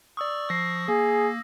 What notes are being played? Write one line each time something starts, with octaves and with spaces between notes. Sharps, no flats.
D5 C#6 D#6 E6
F3 C#6 D#6 E6 A#6 C7
A#3 G#4